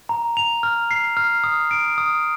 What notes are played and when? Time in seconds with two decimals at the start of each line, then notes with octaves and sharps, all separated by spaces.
0.09 A#5
0.37 F7
0.63 F6
0.91 C7
1.17 F6
1.44 D#6
1.71 D7
1.98 D#6